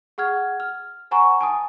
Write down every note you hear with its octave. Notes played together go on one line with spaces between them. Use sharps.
G#4 F#5 F6 G#6
F6
C5 F#5 G#5 A#5 C#6
G#5 A5 D#6